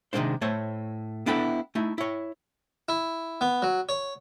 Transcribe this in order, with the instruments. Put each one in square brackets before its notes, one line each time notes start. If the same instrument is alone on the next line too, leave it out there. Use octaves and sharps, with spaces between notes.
[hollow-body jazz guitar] C3 D#3 F#3 G#3 D4 C5
A2 A3 C5 C#5
B3 D4 E4 A4 B4 G5
A3 D#4 E4
E4 C#5
[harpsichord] E4
B3
F#3
C#5